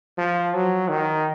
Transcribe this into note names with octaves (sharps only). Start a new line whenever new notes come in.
F3
F#3
D#3